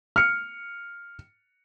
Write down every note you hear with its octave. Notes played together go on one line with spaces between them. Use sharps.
F6 C#7